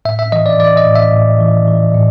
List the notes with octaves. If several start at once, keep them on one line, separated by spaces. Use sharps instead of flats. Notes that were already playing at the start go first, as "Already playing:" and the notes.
A2 E5
E5
E3 D#5
D5
E3 D5
D#5
A2
E5
A2
E3
E3
A2